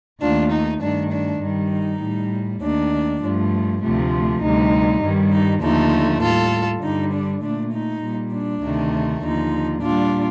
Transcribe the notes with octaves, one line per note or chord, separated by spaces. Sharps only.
D#2 D#3 A3 D4 F4
D#4
G2 D#3 A3 D4
D4
G2 D#3 G3
D#4
A2 G3
D#2 D#3 A3 D4
G2 F3 A3
D2 C3 F3 A3
D2 C3 G3 D#4
G2 D#3 G3
D#4
D#2 D3 F3 A3 D#4
A2 G3 F4 A4
G2 D3 G3 D#4
D4
A#2 A3 D4
D#4
A#2 G3
D4
D2 C3 D#3 A3
D#2 D3 F3 D#4
A#2 G3 D4 F4